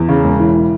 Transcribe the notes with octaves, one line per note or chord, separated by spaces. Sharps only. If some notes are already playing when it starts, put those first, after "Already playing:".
Already playing: E2
C#3
E1
E3